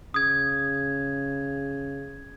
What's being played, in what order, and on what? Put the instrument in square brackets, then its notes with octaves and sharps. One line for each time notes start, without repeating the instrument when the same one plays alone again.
[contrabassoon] C#3 [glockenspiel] D#6 G#6